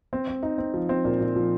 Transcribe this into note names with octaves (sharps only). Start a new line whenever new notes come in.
C4
C4
D#4
C4
F3
C4
A#2
A#2
F3